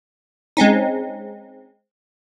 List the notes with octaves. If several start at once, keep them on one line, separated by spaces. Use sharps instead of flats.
G#3 C4 C#4 D#4